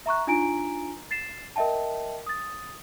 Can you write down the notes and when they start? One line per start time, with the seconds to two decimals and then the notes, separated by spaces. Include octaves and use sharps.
0.06 E5 A#5 C#6 F#6
0.27 D4 D#4 F4 G#5 A#5 D7
1.11 A6 C7 E7
1.56 A#4 D#5 E5 G5 A5
2.26 D#6 A6